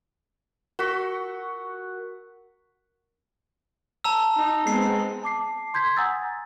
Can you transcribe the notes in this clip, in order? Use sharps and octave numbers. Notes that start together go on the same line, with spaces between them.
F#4 A#4 C#6 B6
A5 A#5 E6
D#4
G#3 B3 C4 C7
A5 D6 C7
C6 G6 G#6 B6
F#5 G#5 A#5 D#6 E6 A6